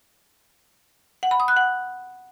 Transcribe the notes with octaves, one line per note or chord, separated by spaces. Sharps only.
F#5
B5
D#6
F#6
F#5